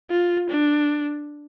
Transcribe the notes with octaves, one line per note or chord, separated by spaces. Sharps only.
F4
D4